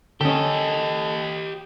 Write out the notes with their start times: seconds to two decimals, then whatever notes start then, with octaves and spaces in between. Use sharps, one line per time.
0.21 D3 C#4 G4 A4 D#5